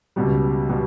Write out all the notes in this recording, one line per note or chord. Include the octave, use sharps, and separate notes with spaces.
C#2 B2 G3
B2 G3